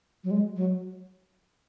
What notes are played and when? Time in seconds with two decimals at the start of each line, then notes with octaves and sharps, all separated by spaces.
0.24 F#3
0.31 G#3
0.56 F#3